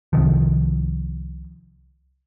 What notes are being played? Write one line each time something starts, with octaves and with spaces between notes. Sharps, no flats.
C2 C3 D#3 F3